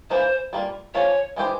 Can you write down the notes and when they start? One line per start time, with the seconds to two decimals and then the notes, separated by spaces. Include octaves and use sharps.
0.10 E3 A#3 F4 C5
0.53 G3 A#3 F4
0.94 F3 A#3 C#4 F4 C#5
1.36 E3 G#3 E4 G4 C5